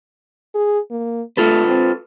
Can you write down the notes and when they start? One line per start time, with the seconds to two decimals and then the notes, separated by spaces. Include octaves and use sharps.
0.55 G#4
0.91 A#3
1.37 A3 F4 A4 B4
1.67 C4